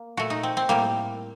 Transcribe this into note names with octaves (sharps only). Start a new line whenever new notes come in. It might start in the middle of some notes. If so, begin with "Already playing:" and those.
Already playing: A#3
A#2 A3 F#4
D#4
C4
C4
A2 G3 A#3